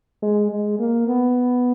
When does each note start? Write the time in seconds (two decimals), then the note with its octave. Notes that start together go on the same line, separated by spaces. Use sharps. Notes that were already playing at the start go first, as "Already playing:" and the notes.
0.23 G#3
0.51 G#3
0.79 A#3
1.07 B3